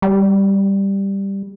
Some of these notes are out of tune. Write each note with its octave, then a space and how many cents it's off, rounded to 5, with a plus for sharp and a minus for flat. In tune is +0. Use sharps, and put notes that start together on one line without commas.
G3 +5